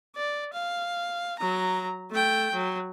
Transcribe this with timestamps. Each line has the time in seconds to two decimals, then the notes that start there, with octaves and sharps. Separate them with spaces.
0.16 D5
0.53 F5
1.39 F#3 A#5
2.11 A3 G5
2.54 F#3